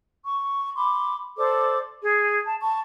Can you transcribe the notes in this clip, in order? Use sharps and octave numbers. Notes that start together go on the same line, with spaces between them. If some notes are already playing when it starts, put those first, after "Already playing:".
C#6
B5 C6 D6
A4 C5 D5 D6
G#4
A5
A5 C#6